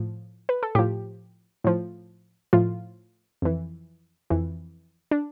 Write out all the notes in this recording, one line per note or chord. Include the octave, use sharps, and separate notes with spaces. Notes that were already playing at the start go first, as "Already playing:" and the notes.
Already playing: A2 F3
B4
A4
A2 F3 G4
A2 F3
A2 F3 F4
F2 E3
F2 E3
D4